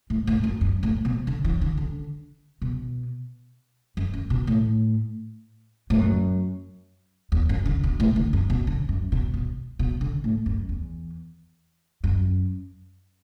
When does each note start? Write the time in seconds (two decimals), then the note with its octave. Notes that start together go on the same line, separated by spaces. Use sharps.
0.10 A2
0.27 A2
0.43 F#2
0.61 F#2
0.83 A2
1.05 B2
1.27 D3
1.45 E3
1.61 D3
1.77 D3
2.62 B2
3.97 F#2
4.14 F#2
4.30 B2
4.47 A2
5.90 A2
5.99 F#2
7.32 E2
7.49 F#2
7.66 D3
7.84 B2
8.00 A2
8.16 D3
8.33 F#2
8.50 B2
8.67 D3
8.89 F#2
9.12 B2
9.34 B2
9.79 B2
10.01 D3
10.24 A2
10.46 F#2
10.69 E2
12.04 F#2